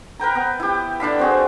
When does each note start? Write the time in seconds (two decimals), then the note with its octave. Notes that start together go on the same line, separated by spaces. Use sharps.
0.20 A#4 B4 G5 A#5
0.35 B3
0.60 E4 G4
1.00 D3 D4 F5 B5
1.19 C4 F#4 G#4